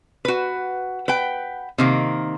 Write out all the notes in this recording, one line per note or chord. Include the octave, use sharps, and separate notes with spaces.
F#4 B4
B4 F#5 G5
C3 D#3 A#3